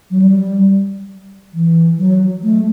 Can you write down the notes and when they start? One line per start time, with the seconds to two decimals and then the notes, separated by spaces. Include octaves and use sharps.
0.11 F#3
0.22 G3
1.54 E3
1.98 F#3
2.43 A3